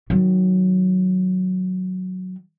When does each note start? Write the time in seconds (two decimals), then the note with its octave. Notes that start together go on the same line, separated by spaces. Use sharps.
0.10 D#3 F#3